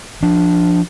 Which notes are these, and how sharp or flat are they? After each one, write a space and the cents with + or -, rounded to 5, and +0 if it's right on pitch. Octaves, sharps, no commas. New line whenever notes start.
F3 +0 D4 +0